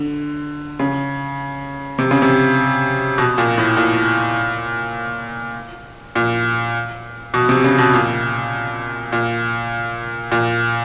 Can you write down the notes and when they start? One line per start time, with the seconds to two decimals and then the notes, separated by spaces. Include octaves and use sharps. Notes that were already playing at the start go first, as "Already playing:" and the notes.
Already playing: D3
0.79 C#3
1.99 C3
2.11 C#3
2.22 C3
3.18 B2
3.38 A#2
3.58 A2
3.77 A#2
6.15 A#2
7.34 B2
7.49 C3
7.64 C#3
7.78 B2
7.94 A#2
9.12 A#2
10.32 A#2